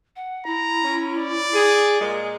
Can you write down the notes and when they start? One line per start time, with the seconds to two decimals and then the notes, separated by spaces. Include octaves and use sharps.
0.16 F#5
0.46 E4 A#5
0.82 C#4
1.19 D5
1.53 G#4
2.00 A#2 G#3